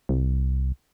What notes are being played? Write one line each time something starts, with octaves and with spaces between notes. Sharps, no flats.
C2